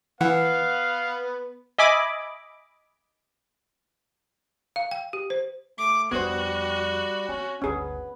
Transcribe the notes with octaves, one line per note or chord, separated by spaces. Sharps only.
E3 B3 B4 F5 F#5
D#5 E5 G#5 B5 D6
F5
G5
G4
C5
A3 D6
F2 G3 B3 D4 F#4 C5
C4 C#4
G1 D2 B3 C#4 G#4